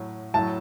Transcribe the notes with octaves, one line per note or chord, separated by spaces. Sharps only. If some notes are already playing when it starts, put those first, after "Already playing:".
Already playing: A2 F#3
A2 F#3 A5